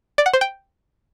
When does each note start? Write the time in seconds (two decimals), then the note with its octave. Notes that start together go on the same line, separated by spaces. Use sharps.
0.18 D5
0.26 F#5
0.34 C5
0.41 G5